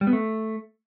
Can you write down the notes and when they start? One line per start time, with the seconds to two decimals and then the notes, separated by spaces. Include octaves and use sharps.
0.01 G3
0.07 B3
0.13 A3